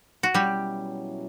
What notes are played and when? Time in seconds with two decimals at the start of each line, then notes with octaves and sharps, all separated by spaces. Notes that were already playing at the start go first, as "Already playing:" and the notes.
0.23 F#4
0.34 B2 F#3 G3 C#4 E4 G4